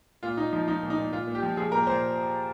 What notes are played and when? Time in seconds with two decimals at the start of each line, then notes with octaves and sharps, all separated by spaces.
0.23 A#2 F4
0.37 A#2 D#4
0.53 F3 D#4
0.68 F3 D#4
0.83 A#2
0.90 D#4
0.98 A#2
1.12 A#2 F4
1.27 A#2
1.35 G4
1.43 F3
1.57 F3 G#4
1.72 A#2 A#4
1.87 A#2 C5